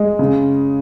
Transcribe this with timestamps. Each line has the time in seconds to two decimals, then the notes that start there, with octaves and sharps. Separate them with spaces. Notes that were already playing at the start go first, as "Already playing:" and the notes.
Already playing: G#3
0.19 C#3